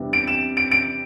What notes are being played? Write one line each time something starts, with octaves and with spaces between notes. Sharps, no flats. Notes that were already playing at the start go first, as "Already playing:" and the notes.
Already playing: E2 C3 G3 B3 D4
D7
E7
D7
D7